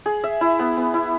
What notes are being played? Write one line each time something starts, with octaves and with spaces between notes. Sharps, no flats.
G#4
E5
E4
B3
B3
E4